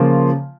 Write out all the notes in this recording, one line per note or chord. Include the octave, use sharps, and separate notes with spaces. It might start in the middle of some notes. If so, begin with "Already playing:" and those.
Already playing: C#3 F3 A#3 F4